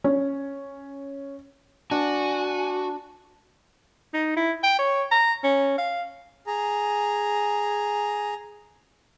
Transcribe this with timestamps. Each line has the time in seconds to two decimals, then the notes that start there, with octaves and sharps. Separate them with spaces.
0.04 C#4
1.91 D4 F#4 G#5
4.14 D#4
4.36 E4
4.63 G5
4.79 C#5
5.11 A#5
5.44 C#4
5.78 F5
6.47 G#4 A#5